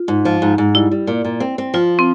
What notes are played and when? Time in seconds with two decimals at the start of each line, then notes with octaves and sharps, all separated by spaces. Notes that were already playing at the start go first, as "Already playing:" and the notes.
Already playing: F4
0.08 G#2
0.25 F3
0.42 G#2
0.58 G#2
0.75 G3 E4
0.91 G3
1.07 A#2
1.25 A#2
1.40 C4
1.58 C4
1.74 F3 F4
1.99 C4